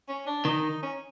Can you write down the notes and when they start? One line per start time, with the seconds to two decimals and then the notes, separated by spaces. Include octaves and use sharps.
0.08 C#4
0.27 D4
0.45 D#3 D#4
0.83 C#4